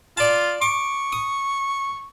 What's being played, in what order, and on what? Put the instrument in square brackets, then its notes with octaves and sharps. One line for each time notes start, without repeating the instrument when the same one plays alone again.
[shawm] F4 [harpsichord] D5 A5
[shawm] C#6 [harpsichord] D6
[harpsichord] D#6